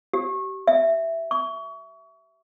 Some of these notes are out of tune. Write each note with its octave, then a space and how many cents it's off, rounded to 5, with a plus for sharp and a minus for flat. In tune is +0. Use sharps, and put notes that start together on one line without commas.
G4 -35
E5 +5
C#6 +30